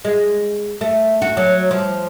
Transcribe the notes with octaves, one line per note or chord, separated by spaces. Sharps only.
G#3
A3
F#4
F#3
F3